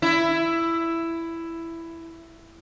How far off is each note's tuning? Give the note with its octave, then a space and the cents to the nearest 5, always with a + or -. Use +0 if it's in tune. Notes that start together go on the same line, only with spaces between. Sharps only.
E4 +10